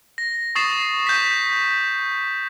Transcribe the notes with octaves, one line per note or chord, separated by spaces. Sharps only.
A#6
C#6 D#6 A6 C7 E7
G6 B6